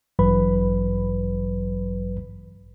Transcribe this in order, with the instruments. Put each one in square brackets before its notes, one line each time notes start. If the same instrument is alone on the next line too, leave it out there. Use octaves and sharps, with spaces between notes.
[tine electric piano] A1 G2 E3 F#3 B4 B5